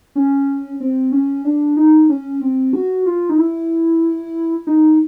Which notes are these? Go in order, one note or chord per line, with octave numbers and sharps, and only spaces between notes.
C#4
C4
C#4
D4
D#4
C#4
C4
F#4
F4
D#4
E4
D#4